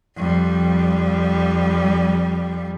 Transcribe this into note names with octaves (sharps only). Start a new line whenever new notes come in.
F2 G3